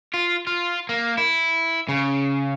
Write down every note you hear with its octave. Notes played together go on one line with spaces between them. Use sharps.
F4
F4
A#3
E4
C#3